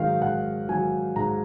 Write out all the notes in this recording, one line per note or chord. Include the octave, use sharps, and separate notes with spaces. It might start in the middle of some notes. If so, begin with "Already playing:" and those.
Already playing: G#2 D#3 F#3 F5
G#2 F#5
D#3 F#3 G#5
G#2 A#5